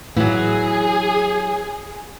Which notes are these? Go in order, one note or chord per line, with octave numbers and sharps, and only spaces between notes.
A2 E3 F#3 G#4